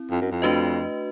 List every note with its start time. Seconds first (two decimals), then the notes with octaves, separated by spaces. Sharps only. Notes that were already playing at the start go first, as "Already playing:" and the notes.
Already playing: C4 E4
0.11 F2
0.21 F#2
0.31 F2
0.42 A3 D4 F#4 B4 D#5